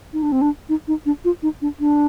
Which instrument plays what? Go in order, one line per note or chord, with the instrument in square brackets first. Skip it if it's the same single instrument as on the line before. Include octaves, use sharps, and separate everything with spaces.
[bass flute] D#4
D4
C4
D4
D#4
D#4
D4
F4
D#4
D4
D4